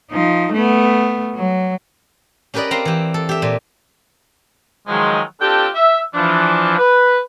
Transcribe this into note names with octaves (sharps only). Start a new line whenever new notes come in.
F3 D#4
A3 B3
F#3
C#4 G4 A#4 B4 D5 D#5
C4 F5 A#5 C6
E3 G4
A4
G4 E5
A#2
D#3 F3 F#3 G#3
C4 D4 F4 G4 A4 G5
E5
E3 F3 D4
B4